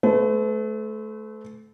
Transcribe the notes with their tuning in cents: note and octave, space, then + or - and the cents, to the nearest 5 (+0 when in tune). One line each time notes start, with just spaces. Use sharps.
A3 -25 B4 +40